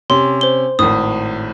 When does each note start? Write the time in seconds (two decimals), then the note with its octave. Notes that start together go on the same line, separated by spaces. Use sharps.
0.10 C3 C#4 C6
0.41 C5 G7
0.79 G#1 A2 D#6